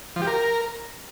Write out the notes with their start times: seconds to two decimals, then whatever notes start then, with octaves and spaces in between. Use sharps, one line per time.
0.16 F3
0.22 G4
0.27 A#4